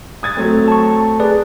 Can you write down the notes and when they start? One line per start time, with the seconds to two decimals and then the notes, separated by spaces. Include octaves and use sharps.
0.23 D#6 G#6 A6
0.37 F#3 A3 C4
0.68 A5 C#6
1.20 G#4 B4 D5